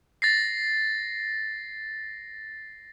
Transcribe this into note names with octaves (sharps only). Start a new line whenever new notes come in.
A6 A#6 C7